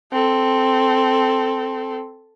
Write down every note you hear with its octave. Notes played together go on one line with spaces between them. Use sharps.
C4 A4